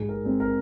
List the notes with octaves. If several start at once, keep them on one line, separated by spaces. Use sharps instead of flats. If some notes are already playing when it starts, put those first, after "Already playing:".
Already playing: G#2 G#4
A#4
G#3 C4
A#4